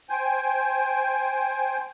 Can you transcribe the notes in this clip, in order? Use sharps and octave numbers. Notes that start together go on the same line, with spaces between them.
C5 G5 G#5